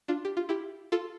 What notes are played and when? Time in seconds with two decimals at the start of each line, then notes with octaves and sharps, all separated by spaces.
0.08 D4 F4
0.25 G4
0.37 F4
0.49 E4 G4
0.92 F4 A4